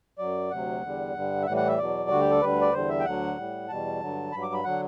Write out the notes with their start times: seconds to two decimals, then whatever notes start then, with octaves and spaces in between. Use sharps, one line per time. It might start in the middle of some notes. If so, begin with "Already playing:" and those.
0.18 F#2 F#3 D5
0.51 D2 C3 F#3 F#5
0.83 E2 D3 G3
1.14 G2 D3 G3
1.42 E5
1.47 A2 E3 G3 F#5
1.57 F#5
1.68 E5
1.77 E2 B2 F#3 D5
2.10 D2 D3 G3 F#4
2.20 G4
2.30 A4
2.41 D2 D3 G3 B4
2.62 D5
2.73 E2 D3 G3 C5
2.89 E5
3.00 G5
3.05 D2 D3 F#3 F#5
3.37 A2 G3
3.69 E2 B2 G3 A5
4.01 G2 D3 F#3
4.32 G2 F#3 B5
4.43 D6
4.54 B5
4.64 D3 F#3 F#5